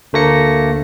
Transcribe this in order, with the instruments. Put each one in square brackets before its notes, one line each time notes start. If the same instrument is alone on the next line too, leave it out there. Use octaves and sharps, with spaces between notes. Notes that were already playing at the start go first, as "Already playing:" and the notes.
[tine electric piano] D2 A3 A#3 A#6 C#7